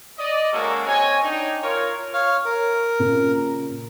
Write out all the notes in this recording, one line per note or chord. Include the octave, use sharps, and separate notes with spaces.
D5 D#5
G#3 A#3 C#4 F#4 A4 A#4
C4 C#5 D#5 G#5
D4 D#4 G5
F4 A#4 C#5
C#5 F5 F6
A#4
A#2 C#3